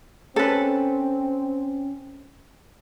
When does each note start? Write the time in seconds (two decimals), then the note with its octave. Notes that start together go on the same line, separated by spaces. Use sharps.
0.36 C4 C#4 A4 B4